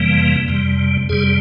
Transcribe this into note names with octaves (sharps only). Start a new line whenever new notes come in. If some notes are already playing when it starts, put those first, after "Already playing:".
Already playing: F2 C3 E3 G3 A#3
F2 C3 G3
F2 C3 G3 G#4